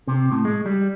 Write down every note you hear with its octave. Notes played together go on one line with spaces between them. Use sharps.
C3
A2
G#3
G3